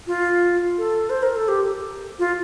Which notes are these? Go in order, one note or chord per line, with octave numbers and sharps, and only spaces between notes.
F4
A4
C5
A#4
A4
G4
F4